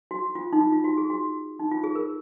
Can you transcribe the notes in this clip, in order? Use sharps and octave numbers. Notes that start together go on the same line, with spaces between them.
F#4
F4
D#4
F4
F4
F#4
G#4
F#4
D#4
F4
G#4
A#4